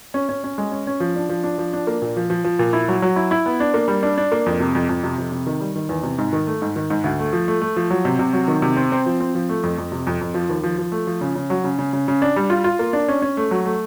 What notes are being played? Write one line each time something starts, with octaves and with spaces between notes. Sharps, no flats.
C#4
C#4
C#4
G#3
C#4
C#4
F3
D4
F3
D4
F3
D4
A#3
A#2
F3
F3
F3
A#2
E4
F#3
F#3
E4
E4
B3
D4
A#3
G3
D4
D4
A#3
F2
C3
F2
F2
C3
F2
C3
D#3
G3
D#3
E2
C3
G#2
D#3
A3
G#2
D#3
G#2
D2
A3
F3
A3
A3
F3
F#3
C3
C3
F#3
D#3
C3
C4
C4
F3
C4
F3
A3
F2
F2
C3
F2
F2
F3
D#2
F3
F3
A3
F3
C#3
C#3
F#3
C#3
C#3
C#3
C#3
D4
G3
F4
F4
A#3
D4
C#4
C#4
A3
F#3
A3